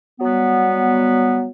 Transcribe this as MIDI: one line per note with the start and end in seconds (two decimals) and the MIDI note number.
0.20 1.50 54
0.20 1.50 55
0.20 1.50 59